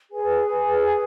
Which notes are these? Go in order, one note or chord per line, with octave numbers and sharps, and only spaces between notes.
G#4 B4 G#5